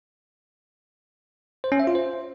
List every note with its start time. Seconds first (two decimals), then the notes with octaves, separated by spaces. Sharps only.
1.64 C5
1.72 C#4
1.80 E5
1.87 F4
1.95 C5